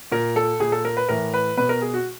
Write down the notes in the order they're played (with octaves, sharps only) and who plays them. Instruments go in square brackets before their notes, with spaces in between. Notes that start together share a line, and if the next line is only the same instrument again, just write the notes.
[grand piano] A#2 A#4
A4
A#2 G#4
A4
A#4
B4
A2 E3 A#4
B4
B2 B4
A#4
G#4
F#4